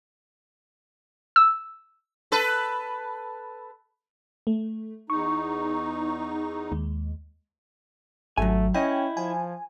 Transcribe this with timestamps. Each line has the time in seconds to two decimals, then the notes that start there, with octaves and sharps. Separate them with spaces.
1.36 E6
2.32 A4 B4
4.47 A3
5.10 E2 D#4 C#6
6.72 D#2 G#3
8.38 G#1 F#3 A3 G#5
8.74 C#4 E4 D#5 G5
9.17 F3 G#5